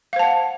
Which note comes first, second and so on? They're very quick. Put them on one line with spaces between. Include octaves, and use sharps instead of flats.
F5 C5 A5 F#5